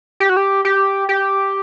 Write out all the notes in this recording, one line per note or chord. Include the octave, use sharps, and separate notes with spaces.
G4
F#4
G4
G4
G4